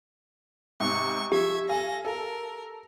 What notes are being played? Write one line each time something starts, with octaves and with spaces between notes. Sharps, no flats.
G#2 C3 C#6
F3 G4 E5 G#6
A4 F5 G#5 A#6
A4 A#4